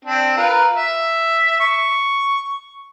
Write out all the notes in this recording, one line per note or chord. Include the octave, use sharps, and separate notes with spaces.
C4 D4
F4 A#4 B4
E5
C#6